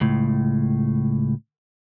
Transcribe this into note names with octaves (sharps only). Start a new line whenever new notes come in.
C#2 A2